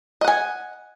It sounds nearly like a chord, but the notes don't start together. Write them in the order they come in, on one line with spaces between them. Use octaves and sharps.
D#5 F#5 G#5